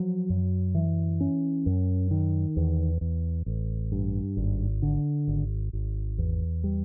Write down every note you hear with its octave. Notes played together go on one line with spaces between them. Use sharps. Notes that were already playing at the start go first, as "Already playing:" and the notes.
Already playing: F3 F#3
F#2
E3
C#4
F#2
D#3
E2
E2
A1
G2
G#1
D3
G#1
G#1
E2
G3